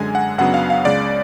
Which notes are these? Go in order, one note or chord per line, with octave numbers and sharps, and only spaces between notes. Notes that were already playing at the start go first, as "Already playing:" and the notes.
Already playing: F#2 D3 G#3 G#5
F#5
F#2 C#3 F#3 B3 D4 F#5
F5
F5
C#2 C#3 G#3 D5